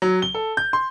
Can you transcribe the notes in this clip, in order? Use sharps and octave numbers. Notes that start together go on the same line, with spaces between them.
F#3
G7
A4
G6
C6